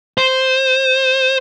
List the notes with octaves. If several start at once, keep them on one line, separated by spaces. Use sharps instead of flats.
C5